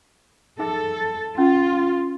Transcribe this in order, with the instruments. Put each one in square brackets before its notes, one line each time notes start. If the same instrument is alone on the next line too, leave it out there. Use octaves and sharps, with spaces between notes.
[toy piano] D#4 G#4 E5 [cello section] A4
[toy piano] C#4 [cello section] F4